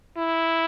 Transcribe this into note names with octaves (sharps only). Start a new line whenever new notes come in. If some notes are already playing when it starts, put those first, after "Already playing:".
E4